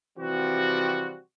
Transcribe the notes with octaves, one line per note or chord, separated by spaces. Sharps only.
C3 E3 F3 G3 C4 F#4